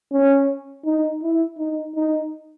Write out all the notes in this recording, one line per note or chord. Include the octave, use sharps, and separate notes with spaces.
C#4
D#4
E4
D#4
D#4